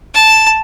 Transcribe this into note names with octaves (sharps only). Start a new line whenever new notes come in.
A5